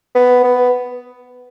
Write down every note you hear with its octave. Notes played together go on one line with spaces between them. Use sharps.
B3
B3